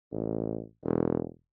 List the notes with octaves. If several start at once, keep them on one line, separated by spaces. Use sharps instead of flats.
A1
E1